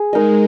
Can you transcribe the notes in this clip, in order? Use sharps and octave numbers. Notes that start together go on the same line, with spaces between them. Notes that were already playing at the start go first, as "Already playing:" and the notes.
Already playing: G#4
G#3 D#4 A#4 D#5